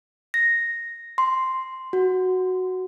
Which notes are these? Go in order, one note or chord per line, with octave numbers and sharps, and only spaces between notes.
A#6
C6
F#4